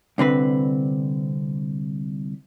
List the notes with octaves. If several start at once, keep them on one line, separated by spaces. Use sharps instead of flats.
C2 D3 C4 B4